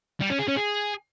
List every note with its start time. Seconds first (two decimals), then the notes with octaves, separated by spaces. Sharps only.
0.21 G3
0.30 C#4
0.39 G#4
0.48 C#4
0.57 G#4